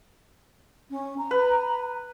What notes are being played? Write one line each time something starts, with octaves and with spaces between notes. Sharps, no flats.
C#4
A#5
B4